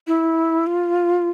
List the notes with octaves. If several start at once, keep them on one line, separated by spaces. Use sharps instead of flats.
E4
F4